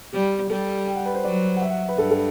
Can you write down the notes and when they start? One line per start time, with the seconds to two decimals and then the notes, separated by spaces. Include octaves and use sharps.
0.13 G3 G4
0.50 G3 A4
0.87 G5
0.96 F#5
1.06 B4
1.14 C5
1.24 F#3 D5
1.56 F#5
1.61 E5
1.70 F#5
1.88 B4
1.98 G2 A4
2.11 A4